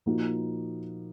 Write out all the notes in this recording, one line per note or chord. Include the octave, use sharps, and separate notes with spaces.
A#2 F3 A#3 D#4 F#4